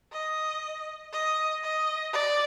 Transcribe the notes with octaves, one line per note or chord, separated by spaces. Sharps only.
D#5
D#5
D#5
D5